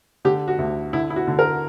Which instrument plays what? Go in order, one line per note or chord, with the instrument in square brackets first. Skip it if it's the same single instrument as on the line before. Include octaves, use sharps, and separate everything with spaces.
[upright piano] D3 G4
F#4
D2
D3 E4
E4
F#4
D3
A#4